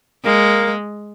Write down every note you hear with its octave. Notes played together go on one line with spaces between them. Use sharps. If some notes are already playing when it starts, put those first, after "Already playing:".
G#3 A#3